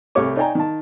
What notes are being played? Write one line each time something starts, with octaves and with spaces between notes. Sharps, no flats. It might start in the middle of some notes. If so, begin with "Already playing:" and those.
C2 A3 G4 C#5 D6
D#4 C#5 D5 G5 G#5 A#5
D#3 A5